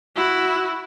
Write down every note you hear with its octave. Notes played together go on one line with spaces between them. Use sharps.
E4 F#4